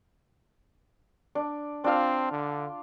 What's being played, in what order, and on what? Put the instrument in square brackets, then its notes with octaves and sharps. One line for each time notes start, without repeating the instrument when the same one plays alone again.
[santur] D4
[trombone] C4 [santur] D4 F4 F5
[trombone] D3